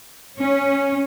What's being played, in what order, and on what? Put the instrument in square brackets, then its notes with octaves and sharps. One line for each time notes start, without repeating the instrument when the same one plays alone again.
[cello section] C#4